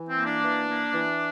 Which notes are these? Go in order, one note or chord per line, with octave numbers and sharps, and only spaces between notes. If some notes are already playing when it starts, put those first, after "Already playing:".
Already playing: E3
C4
A#3
D4
E3
A#3
E3